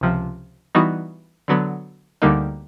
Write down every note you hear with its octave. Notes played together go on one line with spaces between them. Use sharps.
C#2 C3 F3
E3 G3 B3 D#4 F#4
D3 F#3 B3
D2 D3 G3 A#3 D#4